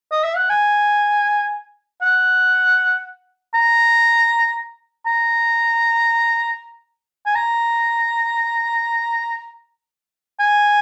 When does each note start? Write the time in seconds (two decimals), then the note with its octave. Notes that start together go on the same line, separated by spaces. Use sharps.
0.11 D#5
0.24 E5
0.36 F#5
0.50 G#5
2.02 F#5
3.54 A#5
5.06 A#5
7.26 G#5
7.35 A#5
10.40 G#5